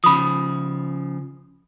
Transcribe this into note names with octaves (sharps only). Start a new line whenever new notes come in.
C#3 F3 B5 D#6